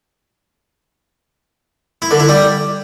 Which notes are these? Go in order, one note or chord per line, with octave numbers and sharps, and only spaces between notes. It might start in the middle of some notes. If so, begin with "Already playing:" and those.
E4
D3
E4
G3